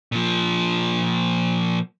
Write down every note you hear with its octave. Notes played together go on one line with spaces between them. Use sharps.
A#2 F3